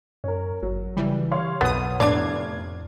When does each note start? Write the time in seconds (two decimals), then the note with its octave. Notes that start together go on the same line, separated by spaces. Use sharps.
0.24 F#2 C#4 A#4
0.63 G1 F#3
0.97 C#3 E3 G3
1.32 C#5 F5 C6
1.61 B1 F2 B2 B3 D#6
2.00 F1 A2 B3 D4 D5 G#6 C7